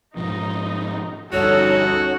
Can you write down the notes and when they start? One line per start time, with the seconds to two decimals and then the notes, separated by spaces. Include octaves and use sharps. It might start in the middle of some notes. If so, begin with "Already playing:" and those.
0.17 G#2 B2 F3 D#4
1.33 G1 D2 G2 C#4 D#4 F#4 A4 C#5